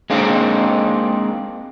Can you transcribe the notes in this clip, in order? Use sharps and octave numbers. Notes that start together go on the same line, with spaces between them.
G#3 A#3 C4 D4 D#4